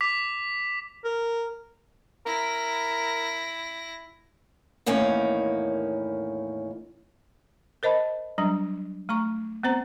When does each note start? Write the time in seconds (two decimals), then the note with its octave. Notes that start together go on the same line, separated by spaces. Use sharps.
0.01 D6 B6 F7
1.05 A#4
2.26 E4 A#4 A#6
4.86 E2 A2 D#3 A#3 C#4
7.83 A#4 C5 D#5 A5 B5
8.38 F#3 G3 D4 A#5
9.09 A3 A#5 C#6
9.63 B3 C4 C5 A#5